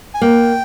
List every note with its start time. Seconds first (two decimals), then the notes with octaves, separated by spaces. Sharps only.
0.14 G#5
0.21 A#3 G5